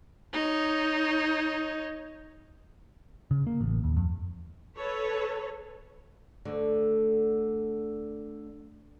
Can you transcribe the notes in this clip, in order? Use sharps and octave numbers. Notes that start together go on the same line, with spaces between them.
D#4 C#5
C#3
A#3
A1
D#2
F2
A4 B4 C#5
D2 D3